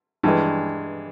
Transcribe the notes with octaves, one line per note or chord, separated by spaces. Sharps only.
G2 E3 G#3